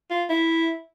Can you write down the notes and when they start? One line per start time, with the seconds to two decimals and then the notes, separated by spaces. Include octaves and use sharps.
0.11 F4
0.30 E4